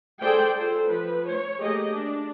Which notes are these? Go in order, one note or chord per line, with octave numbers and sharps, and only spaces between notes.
G#4 A4 C5 D5 G5
F4 A4 C5
F3 B4
C#5
A3 A#3 G4 G#4 D#5
D4